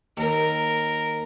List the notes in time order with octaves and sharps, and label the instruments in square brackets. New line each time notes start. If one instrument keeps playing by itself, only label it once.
[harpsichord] D#2 [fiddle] A#4